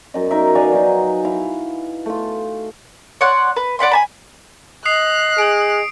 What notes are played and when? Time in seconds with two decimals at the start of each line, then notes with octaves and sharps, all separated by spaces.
0.14 F#2 D#5
0.31 D#4 A#4 E5
0.55 B4 D5 F5 G#5
0.72 F#3 D#4
1.25 E4 F5
2.06 A3 F4
3.21 C#5 D5 F#5 C6
3.56 B4
3.79 D5 F#5 B5 C6
3.91 G#5 A5 B5
4.86 D#5 D#6 F#6 C7
5.38 G#4 D7